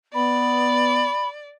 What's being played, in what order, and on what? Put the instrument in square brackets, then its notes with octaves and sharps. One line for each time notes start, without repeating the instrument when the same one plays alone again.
[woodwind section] B3 [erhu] D5 [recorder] B5